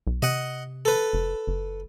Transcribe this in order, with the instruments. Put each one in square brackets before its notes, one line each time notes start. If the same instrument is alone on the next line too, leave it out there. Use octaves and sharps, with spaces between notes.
[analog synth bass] B1
[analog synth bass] C3 [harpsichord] D#5 F#5
[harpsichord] A4 B4
[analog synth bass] F1
F#1